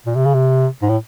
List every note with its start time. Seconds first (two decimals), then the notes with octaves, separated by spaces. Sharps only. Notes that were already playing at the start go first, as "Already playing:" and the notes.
0.06 A#2
0.15 C3
0.25 C#3
0.34 C3
0.82 G#2
0.89 A2